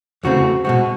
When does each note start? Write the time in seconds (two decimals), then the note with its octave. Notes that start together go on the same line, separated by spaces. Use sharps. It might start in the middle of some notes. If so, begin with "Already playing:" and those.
0.23 E2 C#3 E3 A3 C4 F#4
0.64 B2 G#3 C4 F#4